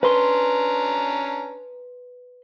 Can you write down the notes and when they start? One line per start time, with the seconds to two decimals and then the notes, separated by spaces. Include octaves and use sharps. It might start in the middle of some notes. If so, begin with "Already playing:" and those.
0.03 C#4 D4 B4 A#5 C6